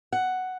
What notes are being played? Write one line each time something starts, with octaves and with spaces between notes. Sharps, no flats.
F#5